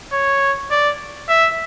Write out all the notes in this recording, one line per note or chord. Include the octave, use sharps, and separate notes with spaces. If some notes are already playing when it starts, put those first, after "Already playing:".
C#5
D5
E5